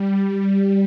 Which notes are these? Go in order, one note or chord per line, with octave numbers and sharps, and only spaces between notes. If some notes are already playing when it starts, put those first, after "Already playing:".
Already playing: G3